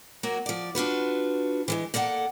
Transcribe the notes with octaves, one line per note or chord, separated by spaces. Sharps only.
F#3 A#3 F#4
F3 D5
D4 F4 F#4 B4
E3 F3 G#3
A#3 A4 D5 E5 F#5